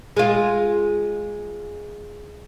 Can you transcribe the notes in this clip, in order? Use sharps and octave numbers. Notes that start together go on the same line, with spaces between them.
G#3 F4